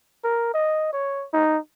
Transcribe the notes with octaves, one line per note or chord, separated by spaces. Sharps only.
A#4
D#5
C#5
D#4